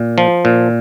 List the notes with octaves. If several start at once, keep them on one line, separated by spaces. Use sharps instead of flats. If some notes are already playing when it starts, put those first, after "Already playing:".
Already playing: A#2
F3
A#2